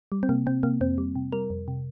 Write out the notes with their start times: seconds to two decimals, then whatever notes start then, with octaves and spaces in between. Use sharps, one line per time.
0.12 G3
0.23 C4
0.29 C3 A#3
0.46 C3 C4
0.63 C3 A#3
0.81 F2 C4
0.98 G3
1.16 C3
1.32 G3 A#4
1.50 F2
1.68 C3